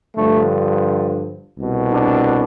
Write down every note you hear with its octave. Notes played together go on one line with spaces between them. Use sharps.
G2 D3 F3 A3
C2 B2
D4